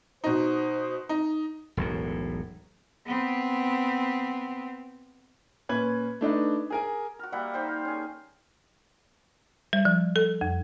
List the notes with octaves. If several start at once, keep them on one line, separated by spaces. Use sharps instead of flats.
B2 D#4 C5
D#4
E1 B1 A2
B3 C4
A#2 C#4 B4 G#6 F#7
A3 D4 D#4 B4
G#4 A#4 G#5
F#4 A#4
G3 A#3 E5 F#5
D#4 C5 G5
A#4
C#4 G#4
G3
F3
A4
F2